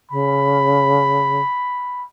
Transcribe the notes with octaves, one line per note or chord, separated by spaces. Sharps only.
C#3 B5